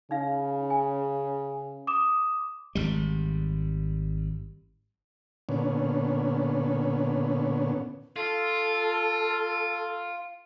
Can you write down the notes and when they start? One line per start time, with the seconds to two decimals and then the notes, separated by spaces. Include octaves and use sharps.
0.11 C#3 D#4 F5
0.70 G#5
1.87 D6 D#6 E7
2.75 G#1 G3
5.49 A#2 D3 B3 C#4
8.16 F4 A4